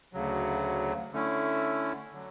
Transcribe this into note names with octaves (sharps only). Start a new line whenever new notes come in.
D2 C#3 F#3
D3 A3 C#4 E4
D3 F#3